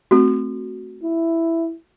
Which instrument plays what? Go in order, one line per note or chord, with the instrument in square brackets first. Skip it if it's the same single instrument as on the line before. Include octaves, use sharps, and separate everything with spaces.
[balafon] A3 C4 [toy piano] F#4 A4
[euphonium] E4